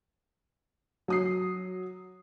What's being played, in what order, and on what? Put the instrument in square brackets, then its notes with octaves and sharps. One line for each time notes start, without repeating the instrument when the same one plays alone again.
[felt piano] F#3 D#6 C7